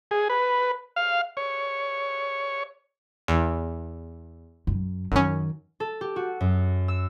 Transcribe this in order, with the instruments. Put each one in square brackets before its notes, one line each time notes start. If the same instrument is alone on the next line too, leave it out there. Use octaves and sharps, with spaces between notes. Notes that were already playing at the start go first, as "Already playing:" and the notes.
[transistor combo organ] G#4
B4
F5
C#5
[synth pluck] E2
[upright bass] F#2
[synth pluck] F#2 C#4 [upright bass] D#3
[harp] A4
G4
F#4
F#2
E6